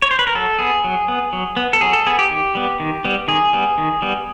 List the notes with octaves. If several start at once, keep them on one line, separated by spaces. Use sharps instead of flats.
C#5
C5
B4
A#4
F#3 A4
B3 G#4
F#3
B3
F#3
B3
A4
F#3 G#4
A4
B3 G#4
G4
D#3
G3 B3
D#3
G3 B3
D#3 G#4
G3 B3
D#3
G3 B3